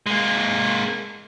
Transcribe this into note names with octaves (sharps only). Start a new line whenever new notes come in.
G#3 A#3